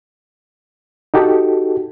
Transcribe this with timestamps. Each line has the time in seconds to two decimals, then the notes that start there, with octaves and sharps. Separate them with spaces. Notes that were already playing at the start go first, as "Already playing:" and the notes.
1.14 D#4 F#4 G4 A4